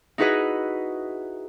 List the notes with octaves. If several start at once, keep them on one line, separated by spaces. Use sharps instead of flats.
D#4 E4 F#4 G#4 B4 D#5